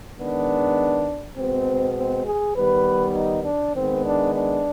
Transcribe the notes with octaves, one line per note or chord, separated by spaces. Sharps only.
D#3 G#3 B3 D4
B2 G#3 B3 C4
C4
G#4
D#3 G3 B3 B4
D#4
D4
D#3 G#3 B3 C4
D4
D4